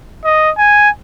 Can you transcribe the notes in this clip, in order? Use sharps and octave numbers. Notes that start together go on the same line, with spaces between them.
D#5
G#5